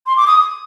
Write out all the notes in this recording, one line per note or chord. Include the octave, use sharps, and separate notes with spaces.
C6
D6
D#6